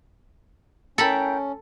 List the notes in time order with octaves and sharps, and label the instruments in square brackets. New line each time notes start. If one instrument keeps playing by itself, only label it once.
[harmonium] C#4 [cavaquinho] E4 A#4 G5 [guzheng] A4 B5